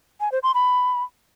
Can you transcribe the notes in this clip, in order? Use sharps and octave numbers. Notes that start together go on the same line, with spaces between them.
G#5
C5
C6
B5